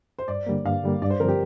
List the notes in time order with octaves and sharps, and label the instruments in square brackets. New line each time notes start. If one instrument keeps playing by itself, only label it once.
[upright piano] C5
[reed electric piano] G2 [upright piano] D5
[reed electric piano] D3 G3 A#3
[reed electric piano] G2 [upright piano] F5
[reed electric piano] D3 G3 A#3
[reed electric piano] G2 [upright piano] D5
[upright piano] C5
[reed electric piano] D3 F3 C4 [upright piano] A#4
[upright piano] G4